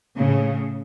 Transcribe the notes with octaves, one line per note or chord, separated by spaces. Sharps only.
A2 C#3